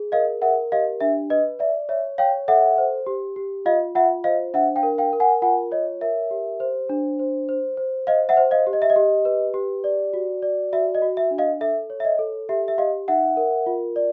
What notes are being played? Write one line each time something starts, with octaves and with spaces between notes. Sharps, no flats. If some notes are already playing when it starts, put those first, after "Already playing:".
Already playing: G#4
A#4 D#5 F5
A#4 E5 F#5
G4 D#5 F5
D4 E5
B4 D#5
D5 E5
C#5 E5
C#5 F5 G5
A4 E5 F#5
C5
G4
G4
F4 D#5 F5
F4 E5 F#5
C5 D#5 F5
D4 E5 F#5
F5 G5
A#4
F5 G5
A#4
F#5 G#5
F4 F#5 G#5
C#5 D#5
A#4 E5
G4
C5
D4
C5
C5
C5
C5 D#5 F5
E5 F#5
C5
D#5 F5
G4
D#5
E5
D#5
G4
B4
G4
D5
F#4
D5
F#4 E5
D#5
F#4
E5
D4
D#5 F5
A4 E5
C#5
E5
D#5
A4
G4 E5
E5
G4 D#5 F5
D#4 E5 F#5
A#4
F4
D5